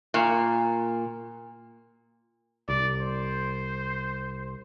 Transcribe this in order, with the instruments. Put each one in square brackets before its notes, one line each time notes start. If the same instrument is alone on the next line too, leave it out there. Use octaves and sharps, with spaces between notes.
[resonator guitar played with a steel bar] A#2
[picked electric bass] C2 [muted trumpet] D5
[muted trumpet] C5